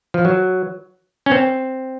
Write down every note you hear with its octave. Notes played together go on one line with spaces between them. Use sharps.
F3
F#3
C#4
C4